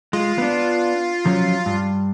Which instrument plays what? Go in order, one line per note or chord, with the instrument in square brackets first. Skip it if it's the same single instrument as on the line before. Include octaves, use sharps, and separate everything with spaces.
[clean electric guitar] G#3 [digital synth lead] F4
[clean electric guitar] B3 D4
F3 F#3 C#4
G2